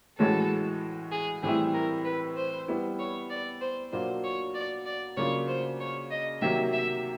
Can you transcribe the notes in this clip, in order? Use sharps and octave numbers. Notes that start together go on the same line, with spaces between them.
A2 E3 G#3 C#4 F#4 A4
G#4
A2 E3 G3 C4 E4 G#4
A#4
B4
C5
G3 B3 E4
C#5
D5
C5
B2 F#3 A#3 D4 F4 C5
C#5
D5
D5
C#3 F#3 A#3 D4 F4 C#5
C5
C#5
D#5
C3 D#3 F#3 A#3 E5
E5